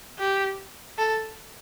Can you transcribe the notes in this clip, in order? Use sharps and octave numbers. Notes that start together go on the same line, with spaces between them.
G4
A4